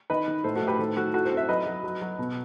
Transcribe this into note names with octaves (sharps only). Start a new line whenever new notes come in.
D#3 B4 D#5
D#3
A2 A4 C5
F#4 A4
A2
G4 B4
D#3 A4 C5
D#3 F#4 A4
E4 F#4 A4
A4 C5
C4
C5 E5
F#3 B4 D#5
F#3
F#3
F#3
B2